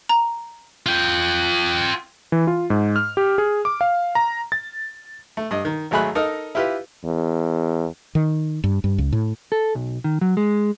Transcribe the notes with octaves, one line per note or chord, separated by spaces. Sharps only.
A#5
F4 G5
E3
F4
G#2
F6
G4
G#4
D6
F5
A#5
A6
A3
G2 D#5
D#3
G#1 F#3 A3 G#4 B5 F#6
D#4 A4 A#4 D#5
E4 F4 G4 B4
E2
D#3
G2
G2
C#2
A2
A4
B1
D#3
F#3
G#3